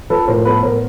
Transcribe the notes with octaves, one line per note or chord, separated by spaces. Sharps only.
F3 A4 B4
A2 A#4 C5
B3 A4 B4
A2 A#4 C5